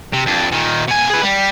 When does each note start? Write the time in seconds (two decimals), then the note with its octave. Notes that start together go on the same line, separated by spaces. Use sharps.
0.13 C3
0.26 F2 D4
0.52 A#2 D#3
0.88 B2 G#5
1.10 G#4 B4
1.23 G3